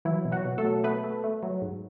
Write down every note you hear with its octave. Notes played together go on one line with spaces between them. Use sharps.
E3 F#3 E4
B2
F#3 F#4
B2
A3 A4
F#3
A3 B3 B4
A3
A3
F#3
G#2